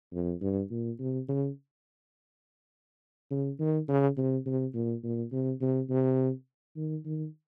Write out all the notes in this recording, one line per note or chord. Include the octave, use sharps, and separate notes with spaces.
F2
G2
A#2
C3
C#3
C#3
D#3
C#3
C3
C3
A#2
A#2
C3
C3
C3
D#3
D#3